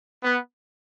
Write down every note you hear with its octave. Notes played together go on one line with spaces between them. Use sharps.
B3